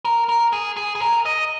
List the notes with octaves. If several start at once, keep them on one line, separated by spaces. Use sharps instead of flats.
A#4
A#4
G#4
G#4
G#4
A#4
D#5